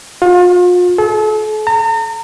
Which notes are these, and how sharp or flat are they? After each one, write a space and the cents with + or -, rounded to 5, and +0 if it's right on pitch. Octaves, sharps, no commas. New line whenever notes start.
F4 +40
A4 -40
A#5 -40